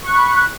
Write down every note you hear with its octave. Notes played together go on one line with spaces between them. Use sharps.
B5 C#6 F#6